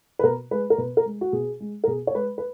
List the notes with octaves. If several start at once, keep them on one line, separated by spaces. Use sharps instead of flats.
B4
B2 A#4
G#3 B4
A#4
B2 B4
A#4
G#3
F#4
B2 G#4
G#3
A#4
B2 G#4
C#5
G#3 B4
B4